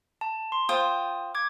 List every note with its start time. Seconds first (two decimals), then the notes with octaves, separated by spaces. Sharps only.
0.21 A5
0.52 C6
0.69 F4 C5 G5 D#6
1.35 D6 G#6